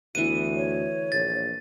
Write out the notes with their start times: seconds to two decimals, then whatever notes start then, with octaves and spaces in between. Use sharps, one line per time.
0.15 D2 E3 B3 F#5 D#7
0.56 C#5
1.12 A#1 A6